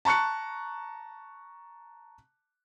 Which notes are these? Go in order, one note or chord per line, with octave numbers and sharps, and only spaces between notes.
A5 A#5 C#6 F#6 C#7